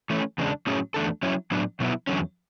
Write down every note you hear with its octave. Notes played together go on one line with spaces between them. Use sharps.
E3 A3 C#4
E2 C#3 G#3 D4
A2 F#3 C#4 G#4
E2 B2 A3 D4 A4
F#3 C#4 E4
A2 F#3 B3 D4
B2 F#3 B3 E4
E2 D3 F#3 C#4